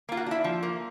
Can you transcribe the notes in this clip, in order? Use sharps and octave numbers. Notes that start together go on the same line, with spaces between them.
A#3 F4
F#4
D4 E4
F3
A#3